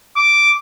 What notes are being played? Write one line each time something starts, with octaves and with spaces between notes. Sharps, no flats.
D6